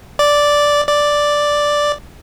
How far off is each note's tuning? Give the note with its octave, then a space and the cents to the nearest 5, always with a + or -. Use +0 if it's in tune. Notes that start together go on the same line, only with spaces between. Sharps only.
D5 -5
D5 +0